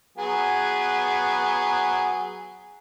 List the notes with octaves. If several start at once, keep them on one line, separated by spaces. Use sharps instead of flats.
F#3 B3 G#4